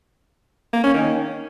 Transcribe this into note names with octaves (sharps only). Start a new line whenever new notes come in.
A#3
C#4
D#3